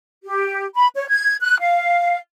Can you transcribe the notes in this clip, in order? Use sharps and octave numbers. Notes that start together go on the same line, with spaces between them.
G4
B5
C#5
G#6
F#6
F5